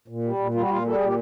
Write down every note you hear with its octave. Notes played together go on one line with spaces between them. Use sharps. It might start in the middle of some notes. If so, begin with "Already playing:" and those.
A#2
G3
A#2
G3 F4
F#4
A#2 F4
G3 A4
A#2 G#4
G4